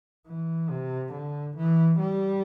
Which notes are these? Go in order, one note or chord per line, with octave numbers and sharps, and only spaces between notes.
E3
C3
D3
E3
G3